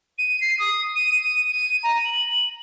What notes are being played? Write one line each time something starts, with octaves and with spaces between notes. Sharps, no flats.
D#7
C7
D#6
D#7
D#7
A#5
F#7